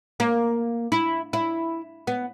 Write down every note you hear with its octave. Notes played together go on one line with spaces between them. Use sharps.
A#3
E4
E4
B3